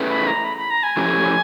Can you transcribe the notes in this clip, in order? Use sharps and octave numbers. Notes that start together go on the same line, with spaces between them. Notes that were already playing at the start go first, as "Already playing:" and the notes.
Already playing: A3 C#4 E4 G#4 B4
B5
A#5
B5
B5
A#5
G#5
F3 A3 C#4 E4 G4